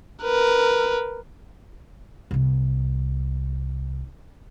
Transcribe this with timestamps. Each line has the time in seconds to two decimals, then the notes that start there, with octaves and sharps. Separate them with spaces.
0.24 A#4 B4
2.31 C2 C3